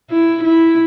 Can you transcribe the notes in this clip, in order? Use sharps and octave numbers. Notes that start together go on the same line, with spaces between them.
E4
E4